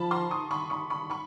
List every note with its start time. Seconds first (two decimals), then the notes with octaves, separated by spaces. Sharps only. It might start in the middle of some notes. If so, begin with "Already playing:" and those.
Already playing: F3 A5 B5
0.11 A#5 C6
0.31 C#6 D#6
0.51 B5 C#6
0.70 B5 C#6
0.90 B5 C#6
1.10 B5 C#6